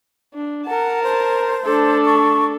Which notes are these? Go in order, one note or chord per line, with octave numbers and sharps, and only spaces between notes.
D4
A#4 F#5 A5
C5
A3 D4 A4
C#6